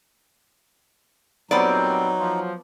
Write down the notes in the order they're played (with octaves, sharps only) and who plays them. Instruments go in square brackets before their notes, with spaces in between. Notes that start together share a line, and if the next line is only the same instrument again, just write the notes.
[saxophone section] A#2 G3 C4 [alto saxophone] F#3 [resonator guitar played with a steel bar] B3 D5 [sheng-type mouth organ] D#4
[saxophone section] F3